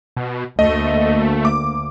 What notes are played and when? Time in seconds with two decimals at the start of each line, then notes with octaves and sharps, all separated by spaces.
0.17 B2
0.59 D2 A3 A#3 D#5
1.45 D6